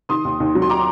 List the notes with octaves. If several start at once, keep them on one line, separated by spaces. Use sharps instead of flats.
D#3 C6 D#6
D#2
D#2
F#3
C6
A#5 D6